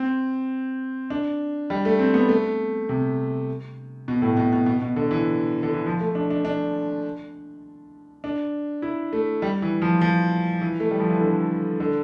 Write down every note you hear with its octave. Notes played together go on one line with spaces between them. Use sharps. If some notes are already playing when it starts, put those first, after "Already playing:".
Already playing: C4
D4
G3
A3
C4
B3
A3
C3
B2
A2
B2
B2
B2
B2
D3
E3
D3
E3
F3
A3
D4
D4
D4
D4
E4
A3
G3
E3
F3
F3
E3
A3
G3
F3
E3
D3
D3